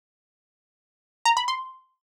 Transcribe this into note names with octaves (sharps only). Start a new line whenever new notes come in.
A#5
B5
C6